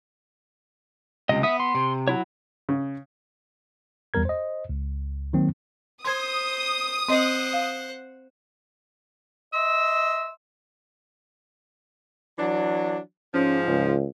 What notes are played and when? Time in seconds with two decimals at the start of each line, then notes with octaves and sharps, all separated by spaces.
1.29 C#2 C3 D#5
1.43 B3 E5 D#6
1.60 C6
1.75 C3
2.08 F#3 E4 C#5
2.69 C#3
4.14 E2 G3 B3 A#4 G#6
4.25 C5 D#5
4.69 C#2
5.33 D#3 F#3 A#3 C4
6.05 C5 C6 D#6 G#6
7.09 C4 C5 D#5 F#5
7.53 F5
9.54 D#5 E5 C6 E6
12.38 E3 F#3 D4
13.34 G#2 F3 C#4
13.67 C#2